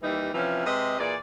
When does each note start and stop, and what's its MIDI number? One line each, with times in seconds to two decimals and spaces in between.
0.01 0.31 39
0.01 0.31 52
0.01 0.31 55
0.01 0.31 63
0.34 0.65 48
0.34 0.65 52
0.34 0.65 53
0.34 0.65 61
0.65 0.97 48
0.65 0.97 56
0.65 0.97 71
0.65 0.97 75
0.98 1.14 46
0.98 1.14 52
0.98 1.14 68
0.98 1.14 74